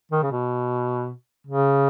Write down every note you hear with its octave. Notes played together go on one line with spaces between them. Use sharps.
D#3
C#3
B2
C#3